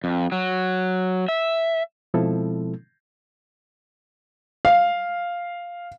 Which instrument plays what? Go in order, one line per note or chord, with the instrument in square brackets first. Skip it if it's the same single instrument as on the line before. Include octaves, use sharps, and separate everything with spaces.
[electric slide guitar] F2
F#3
E5
[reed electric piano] B2 F3 G#3 C4 E4 A4
[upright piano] F5